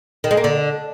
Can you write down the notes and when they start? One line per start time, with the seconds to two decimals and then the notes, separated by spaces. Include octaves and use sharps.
0.24 D#3
0.31 G#3
0.37 A#3
0.44 D3